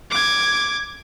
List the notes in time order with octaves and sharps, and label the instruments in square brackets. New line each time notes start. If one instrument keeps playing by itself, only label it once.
[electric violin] D6 G#6